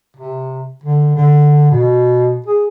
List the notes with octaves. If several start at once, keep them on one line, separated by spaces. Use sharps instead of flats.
C3
D3
D3
B2
G#4